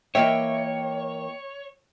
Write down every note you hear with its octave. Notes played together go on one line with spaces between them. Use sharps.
E3 A#3 C#5 D#5 E5 G5